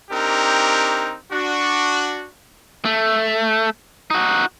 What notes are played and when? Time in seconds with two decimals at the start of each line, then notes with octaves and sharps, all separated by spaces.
0.11 C4 D4 D#4 G4 A#4
1.32 D4 F#4
2.85 A3
4.10 D#4 F#4